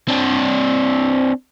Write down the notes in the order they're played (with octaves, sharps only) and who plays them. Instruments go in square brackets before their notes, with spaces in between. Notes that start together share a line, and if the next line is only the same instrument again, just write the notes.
[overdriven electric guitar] C4 D4